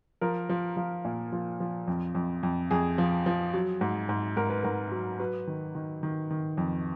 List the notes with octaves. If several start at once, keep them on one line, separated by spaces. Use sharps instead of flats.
F3 A#4
F3
F3
A#2
F3
F3
F2
F2
F2
F2 G#4
F3
F3
F#3
G#2
G#2
G#2 A#4
B4
G#2 A#4
F#3
F#3 B4
D#3
D#3
D#3
D#3
F2